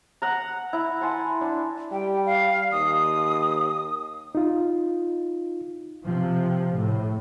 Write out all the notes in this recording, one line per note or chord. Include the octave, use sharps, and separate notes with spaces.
F#5 A#5
E4
F#5 G#5 A5 C6
D4
G3 G5
F5
D#2 D#6
D#4 F4
C3 F3
A2